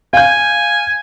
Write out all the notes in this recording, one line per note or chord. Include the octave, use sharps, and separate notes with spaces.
F5 G#5 G6